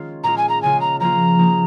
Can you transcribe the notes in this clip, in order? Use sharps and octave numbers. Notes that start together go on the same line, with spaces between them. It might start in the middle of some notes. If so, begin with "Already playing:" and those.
Already playing: D#3 G#3 C#4 F4
A#2 G#3 F4 A#5
G#5
A#5
C#3 G#3 F4 G#5
A#5
F3 A#3 C#4 F4 A#5
F3 A#3 D#4